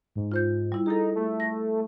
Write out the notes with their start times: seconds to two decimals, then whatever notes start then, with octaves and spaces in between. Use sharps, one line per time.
0.16 G#2
0.32 F4 C5 G6
0.72 G3 E4
0.86 D#4 G#4 A4
1.15 A3
1.40 A#6